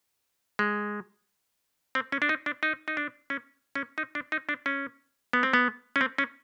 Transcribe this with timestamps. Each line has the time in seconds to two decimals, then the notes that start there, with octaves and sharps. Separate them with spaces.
0.59 G#3
1.95 C4
2.12 C#4
2.22 D4
2.29 D#4
2.46 D4
2.63 D#4
2.88 D#4
2.97 D4
3.30 C#4
3.75 C#4
3.98 D#4
4.15 D4
4.32 D#4
4.49 D4
4.66 C#4
5.33 B3
5.43 C4
5.53 B3
5.96 C#4
6.01 C4
6.18 C#4